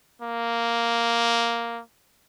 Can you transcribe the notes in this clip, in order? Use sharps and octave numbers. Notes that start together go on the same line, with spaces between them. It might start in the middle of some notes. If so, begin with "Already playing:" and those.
A#3